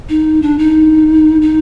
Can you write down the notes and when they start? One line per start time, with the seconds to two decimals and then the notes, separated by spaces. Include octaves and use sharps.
0.09 D#4
0.42 D4
0.59 D#4
1.42 D#4